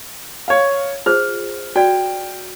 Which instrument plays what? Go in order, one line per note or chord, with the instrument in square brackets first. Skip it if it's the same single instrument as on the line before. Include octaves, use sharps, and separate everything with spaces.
[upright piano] C#5 F5
[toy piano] F4 G#4 C5 [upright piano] F6
[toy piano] F#4 D5 [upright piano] G5